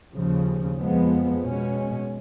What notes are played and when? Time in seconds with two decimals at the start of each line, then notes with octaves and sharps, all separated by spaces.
0.14 D#2 C#3 F3
0.77 F2 F3 G#3 B3
1.43 B2 G#3 C#4